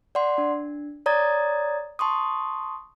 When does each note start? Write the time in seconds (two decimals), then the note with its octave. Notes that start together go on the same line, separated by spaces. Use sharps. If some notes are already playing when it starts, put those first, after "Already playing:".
0.15 D5 F#5 C6
0.38 D4
1.06 C#5 D5 A#5 D#6 G#6 A6
1.99 A5 C6 C#6 D#6